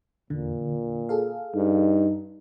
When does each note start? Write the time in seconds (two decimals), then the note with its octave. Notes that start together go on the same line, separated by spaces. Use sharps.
0.30 E2 A#2 D3
1.09 G#4 A4 F5
1.55 G2 D#4